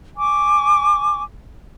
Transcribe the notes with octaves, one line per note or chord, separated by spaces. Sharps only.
G#5 C#6 D6